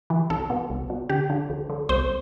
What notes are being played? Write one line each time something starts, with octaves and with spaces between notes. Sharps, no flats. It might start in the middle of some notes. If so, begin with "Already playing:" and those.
E3
C2 A4
B2
C2
B2
D2 G4
D3
D2
D3
C2 C5